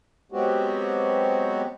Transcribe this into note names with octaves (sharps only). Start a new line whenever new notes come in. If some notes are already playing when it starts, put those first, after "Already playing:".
F#3 G#3 B3 C4 F#4 G4